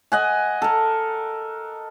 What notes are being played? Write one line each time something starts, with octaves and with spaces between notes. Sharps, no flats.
D#5 F#5 G#5
A4 A#4